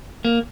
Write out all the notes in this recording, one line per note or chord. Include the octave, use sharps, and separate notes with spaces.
A#3